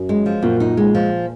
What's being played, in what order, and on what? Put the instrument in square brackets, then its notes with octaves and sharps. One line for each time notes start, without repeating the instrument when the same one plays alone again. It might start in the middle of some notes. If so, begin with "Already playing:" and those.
Already playing: [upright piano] F#2
[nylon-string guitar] G#3
F3
[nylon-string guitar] F#2 [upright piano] A#2
[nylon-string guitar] D#4
G#3
F3